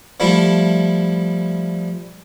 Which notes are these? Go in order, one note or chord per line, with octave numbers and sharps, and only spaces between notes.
F3 G3 A3 E4 E5